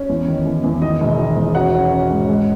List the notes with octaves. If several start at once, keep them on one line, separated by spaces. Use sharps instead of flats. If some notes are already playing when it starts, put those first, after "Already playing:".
Already playing: C#4
E2
D#3
E2
E2
D#3 D#4 D#5
E1
D#3
E1
C#4 F#4 F#5
C#4
C#4
G#2
G#3